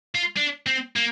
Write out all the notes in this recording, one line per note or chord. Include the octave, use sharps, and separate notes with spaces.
F4
D4
C4
A#3